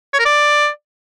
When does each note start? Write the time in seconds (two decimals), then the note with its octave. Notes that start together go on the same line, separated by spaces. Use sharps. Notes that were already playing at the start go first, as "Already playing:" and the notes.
0.13 C#5
0.19 A#4
0.25 D5